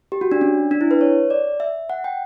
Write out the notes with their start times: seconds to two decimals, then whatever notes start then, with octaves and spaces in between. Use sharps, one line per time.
0.12 G4
0.21 F#4
0.32 D4
0.41 C#4
0.71 D4
0.81 E4
0.91 B4
1.01 C#5
1.30 D5
1.60 E5
1.90 F#5
2.04 G5